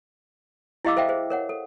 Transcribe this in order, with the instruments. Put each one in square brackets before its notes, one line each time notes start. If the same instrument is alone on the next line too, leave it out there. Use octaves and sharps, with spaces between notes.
[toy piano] E4 G4 D#5 F5 D6 E6
A4 C5 E5 F5 G5
G#4 C5
A#4 C#5 F#5
A4